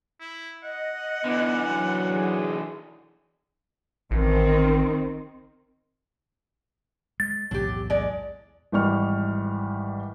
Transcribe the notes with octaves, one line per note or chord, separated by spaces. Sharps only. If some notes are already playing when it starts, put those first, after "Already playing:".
E4
D#5 F#5
D3 E3 B3
F#3
G#4
A1 D#3 C4
G#3 A6
B1 E2 A2 F#3 G4
G#3 D5
G#1 E3 G3 C#6 F6